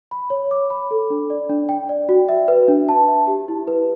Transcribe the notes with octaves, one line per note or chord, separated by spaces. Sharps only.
B5
C#5
D6
B5
A4
D4
D5
D4
G5
D5
F#4
E5
B4
D4
A5
E5
G4
E4
B4